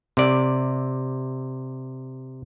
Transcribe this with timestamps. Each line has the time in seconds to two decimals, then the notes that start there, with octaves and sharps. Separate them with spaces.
0.17 C3 D5